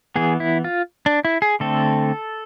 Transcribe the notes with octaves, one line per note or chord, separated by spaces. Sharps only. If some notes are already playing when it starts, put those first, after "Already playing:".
E3 B3 G#4
E4
F4
D4
E4
G#4
D3 A3 C4 A4